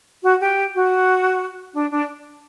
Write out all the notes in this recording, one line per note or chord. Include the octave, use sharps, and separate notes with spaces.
F#4
G4
F#4
D4
D4